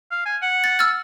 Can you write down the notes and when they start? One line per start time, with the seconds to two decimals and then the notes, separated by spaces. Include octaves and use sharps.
0.11 F5
0.26 G#5
0.42 F#5
0.64 A6
0.79 E6 F6 A6